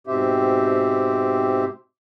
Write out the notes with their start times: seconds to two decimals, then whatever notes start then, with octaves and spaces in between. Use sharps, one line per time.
0.07 G#2 B2 C4 G4 C5 E5